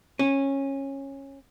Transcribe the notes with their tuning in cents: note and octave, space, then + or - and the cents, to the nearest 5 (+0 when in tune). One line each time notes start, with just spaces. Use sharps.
C#4 -15